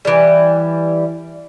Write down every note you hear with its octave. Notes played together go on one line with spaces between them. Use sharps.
E3 G3